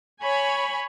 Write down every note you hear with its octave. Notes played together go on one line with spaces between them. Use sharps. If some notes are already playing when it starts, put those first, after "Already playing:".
C#5 G#5 B5